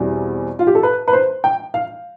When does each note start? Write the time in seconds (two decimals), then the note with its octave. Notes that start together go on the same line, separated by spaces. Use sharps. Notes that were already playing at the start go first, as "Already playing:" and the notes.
Already playing: E2 B2 G3 C4 E4
0.59 F4
0.67 G4
0.75 A4
0.83 B4
1.08 B4
1.13 C5
1.44 G5
1.74 F5